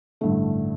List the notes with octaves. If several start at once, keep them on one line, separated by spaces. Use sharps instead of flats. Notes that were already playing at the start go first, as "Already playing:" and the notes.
A1 G2 D3 A3